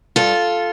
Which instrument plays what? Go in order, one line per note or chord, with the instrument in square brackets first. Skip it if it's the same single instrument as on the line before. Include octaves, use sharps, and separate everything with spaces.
[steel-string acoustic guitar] G2 F4 A4